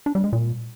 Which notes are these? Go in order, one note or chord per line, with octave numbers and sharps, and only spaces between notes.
D4
G3
G#3
A#2